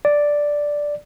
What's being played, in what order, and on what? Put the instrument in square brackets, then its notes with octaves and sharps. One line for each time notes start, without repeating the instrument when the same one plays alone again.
[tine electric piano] D5